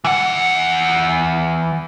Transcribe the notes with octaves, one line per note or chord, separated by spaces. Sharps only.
E3 F#5